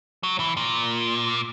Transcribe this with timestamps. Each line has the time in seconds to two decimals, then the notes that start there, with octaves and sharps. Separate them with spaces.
0.23 F#3
0.40 E3
0.57 A#2